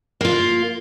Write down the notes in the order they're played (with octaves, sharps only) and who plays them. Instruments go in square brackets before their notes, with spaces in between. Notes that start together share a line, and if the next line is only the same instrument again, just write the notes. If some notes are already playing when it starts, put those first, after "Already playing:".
[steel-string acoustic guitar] A#3 F4